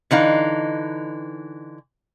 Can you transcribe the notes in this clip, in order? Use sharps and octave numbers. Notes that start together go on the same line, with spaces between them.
D3 E3 D#4 F5